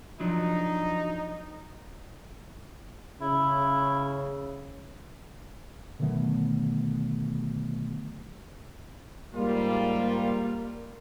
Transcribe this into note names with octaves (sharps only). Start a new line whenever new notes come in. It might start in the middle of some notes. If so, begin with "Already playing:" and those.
F3 F#3 D4 D#4
C#3 E4
B2 D3 D#3 F#3 A3 B3
G#2 G3 A#3 F4